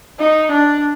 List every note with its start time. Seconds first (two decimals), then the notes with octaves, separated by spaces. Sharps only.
0.20 D#4
0.52 D4